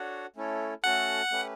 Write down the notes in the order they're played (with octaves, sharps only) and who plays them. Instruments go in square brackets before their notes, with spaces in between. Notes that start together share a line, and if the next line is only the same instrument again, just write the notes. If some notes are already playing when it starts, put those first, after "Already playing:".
Already playing: [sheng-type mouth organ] D4 F#4 A4 C#5 F#5
A3 C#4 E4 A4 C#5
[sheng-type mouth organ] A3 C#4 F#4 A4 [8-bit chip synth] F#5
[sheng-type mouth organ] A3 C#4 G4 B4